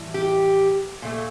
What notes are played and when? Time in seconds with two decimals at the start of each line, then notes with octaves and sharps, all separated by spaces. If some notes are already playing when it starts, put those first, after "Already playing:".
Already playing: A2 E3 G3
0.14 G4
1.02 A#2 A3